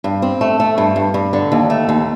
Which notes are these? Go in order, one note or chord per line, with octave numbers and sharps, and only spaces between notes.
G2
C4
A3
A3
G2
G2
G2
D3
D#2
A3
D#2